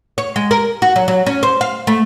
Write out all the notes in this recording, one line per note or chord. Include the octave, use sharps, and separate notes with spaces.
C#5
G#3
A#4
F#4
F#3
F#3
C#4
C5
F5
A3